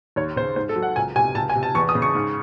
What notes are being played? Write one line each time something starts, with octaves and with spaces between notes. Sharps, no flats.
D#2 C#5
C#3 C5
G#2 C5
A4
F#3
F#5
C#2 G#5
C3 G#5
C#2 A5
G#5
C3
A5
E2 C#6
D#6
C#3
C#6
G#2